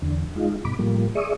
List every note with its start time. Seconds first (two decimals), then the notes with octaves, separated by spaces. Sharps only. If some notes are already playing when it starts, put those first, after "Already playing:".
0.02 E2 D3
0.36 G#3 D#4 F4
0.65 G2 B2 B5 D6
0.79 A2 F3 G3 A#3
1.15 G#4 D5 E5 C#6 D#6